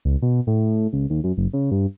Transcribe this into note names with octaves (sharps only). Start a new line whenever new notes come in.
C#2
B2
A2
C#2
D#2
F#2
F#1
C#3
G2